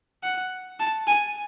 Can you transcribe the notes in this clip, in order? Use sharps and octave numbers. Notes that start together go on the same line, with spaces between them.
F#5
A5
G#5